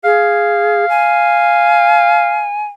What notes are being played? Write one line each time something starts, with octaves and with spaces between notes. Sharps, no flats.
G#4 F5
G#5